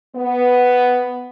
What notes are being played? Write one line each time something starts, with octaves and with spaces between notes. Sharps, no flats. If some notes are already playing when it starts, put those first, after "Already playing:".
B3